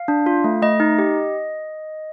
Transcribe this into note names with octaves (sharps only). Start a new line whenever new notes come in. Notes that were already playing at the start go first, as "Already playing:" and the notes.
Already playing: F5
D4
F4
A3
A3 D#5
D#4
G4